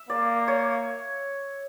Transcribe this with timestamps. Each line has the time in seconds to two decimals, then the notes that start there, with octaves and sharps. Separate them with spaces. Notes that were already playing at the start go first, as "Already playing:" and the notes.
Already playing: E5
0.09 A#3 D5
0.48 C#5